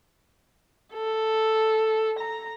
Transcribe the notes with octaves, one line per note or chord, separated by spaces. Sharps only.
A4
A#5